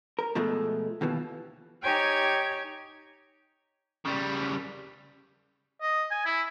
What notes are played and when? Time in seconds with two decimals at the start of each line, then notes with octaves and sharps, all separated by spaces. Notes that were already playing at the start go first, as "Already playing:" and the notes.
0.19 A#4
0.35 B2 F3 G#3 A3
1.01 D#2 B2 E3 F3
1.83 D#4 G4 C#5 G5 G#5 G#6
4.05 C#3 G3
5.82 D#5
6.11 G#5
6.26 E4